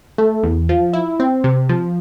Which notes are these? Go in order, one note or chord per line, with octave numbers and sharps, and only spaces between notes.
A3
E2
F3
E4
C4
C3
F3